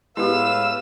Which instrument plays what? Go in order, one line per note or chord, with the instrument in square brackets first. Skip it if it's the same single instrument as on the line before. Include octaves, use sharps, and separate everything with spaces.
[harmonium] A2 B4 F5 [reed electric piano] G#3 B3 [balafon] E4 G4 [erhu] E6